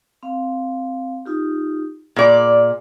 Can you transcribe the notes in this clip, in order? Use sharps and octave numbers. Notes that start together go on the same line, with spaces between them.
C4 F5
D#4 F4 G4
A#2 G#4 D5